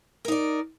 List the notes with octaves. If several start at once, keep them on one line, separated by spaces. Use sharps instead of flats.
D#4 A#4 D5